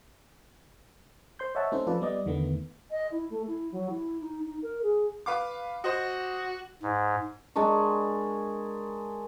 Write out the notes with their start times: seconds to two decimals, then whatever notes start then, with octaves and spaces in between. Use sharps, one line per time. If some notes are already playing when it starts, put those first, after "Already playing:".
1.39 C5 C6 G6
1.55 C#5 D#5 E5 F#5 A5
1.72 A3 C4 C#4 D#4 A4 C5
1.87 F3 F4 A4 B4 D5
2.01 G3 B3 D5 D#5
2.26 E2 D3 D#3 A3 B3
2.90 D#5
3.11 E4
3.29 A3
3.47 E4
3.71 F#3
3.89 E4
4.20 D#4
4.45 D#4
4.62 A#4
4.82 G#4
5.26 B4 F5 D6
5.84 F#4 C5 D#5
6.83 G#2
7.56 G#3 D4 A#4 C#6